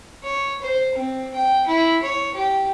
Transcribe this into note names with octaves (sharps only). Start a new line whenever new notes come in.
C#5
C5
C4
G5
E4
C#5
G4